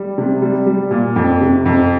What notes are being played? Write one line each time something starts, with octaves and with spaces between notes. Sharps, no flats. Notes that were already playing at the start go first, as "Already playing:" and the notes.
Already playing: G3
C3
G3
G3
A#2
F2
C3
F2